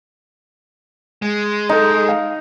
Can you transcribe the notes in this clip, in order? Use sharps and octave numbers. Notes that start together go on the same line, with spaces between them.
G#3
D#4 A4 D#5
F5